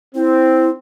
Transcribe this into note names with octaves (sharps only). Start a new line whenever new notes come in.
C4 E4